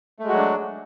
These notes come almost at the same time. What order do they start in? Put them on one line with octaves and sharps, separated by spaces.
A3 G#3 F#4 F#3 D4